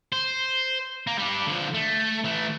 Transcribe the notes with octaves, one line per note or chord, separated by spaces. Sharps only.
C5
A#3
G3 D4
D3 F3
A3
E3 A3